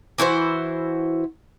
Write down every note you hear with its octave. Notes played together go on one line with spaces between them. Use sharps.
E3 E4 F#4 C5